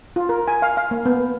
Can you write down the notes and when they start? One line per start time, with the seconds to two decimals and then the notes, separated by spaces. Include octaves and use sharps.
0.16 F4
0.29 A#4
0.48 G#5
0.62 F5
0.77 F5
0.91 A#3
1.06 B3